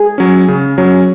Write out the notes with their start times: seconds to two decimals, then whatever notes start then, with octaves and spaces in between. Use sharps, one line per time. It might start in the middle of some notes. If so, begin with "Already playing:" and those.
Already playing: G#4
0.18 F#3 C#4
0.48 C#3
0.78 F#3 C#4